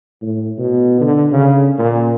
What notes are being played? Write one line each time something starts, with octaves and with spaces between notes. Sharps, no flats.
A2
B2
D3
C#3
A#2